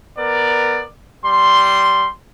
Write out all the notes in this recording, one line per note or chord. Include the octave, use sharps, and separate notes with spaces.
B3 A#4 D5
G3 C6